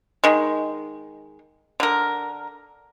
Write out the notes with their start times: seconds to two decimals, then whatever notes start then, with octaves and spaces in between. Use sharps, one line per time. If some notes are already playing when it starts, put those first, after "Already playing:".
0.24 D#3 G#3
1.80 D3 A#4